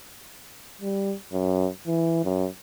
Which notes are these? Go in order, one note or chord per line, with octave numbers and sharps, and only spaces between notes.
G3
F#2
E3
F#2